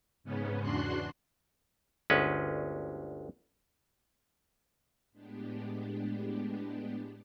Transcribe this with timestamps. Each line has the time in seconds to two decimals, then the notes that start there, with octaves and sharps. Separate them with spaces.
0.24 G#2 C#3 B3 C#4
0.61 E2 D4 F#4 C6 F#6
2.10 G1 D2 G#3 C#4 B4
5.12 A2 G#3 B3 D4 G4